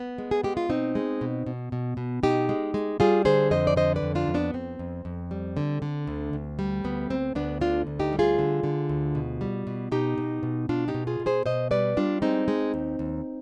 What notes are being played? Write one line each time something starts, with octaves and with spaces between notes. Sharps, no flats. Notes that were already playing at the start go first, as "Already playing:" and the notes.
Already playing: B3
G#3
G#4
G#3 G4
F4
B2 C4 D#4
G#3
B2
B2
B2
B2
B2 D#4 G4
G#3
G#3
G3 F4 G#4
D3 G#4 C5
F2 C5 D#5
D5
D3 C5 D#5
B4 D5
F2
D4 F4
F2
B3 D4
F2 C4
F2
F2
G3
D3
D3
D2
D2
G3
D2 B3
D2 C4
D2 B3 D4
D3 D4 F4
D2
D#4 G4
G3
F4 G#4
D3
D3
D2
B2
G3
B2
B2 D#4 G4
B2
B2
B2 D4 F4
D#4 G4
B2
F4 G#4
B2
G#4 C5
B2 C5 D#5
G3 B4 D5
G3 D4 F4
G#3 C4 D#4
G#3
D#2
D#2